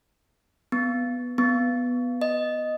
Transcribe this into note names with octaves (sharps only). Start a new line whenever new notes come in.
B3
B3
D#5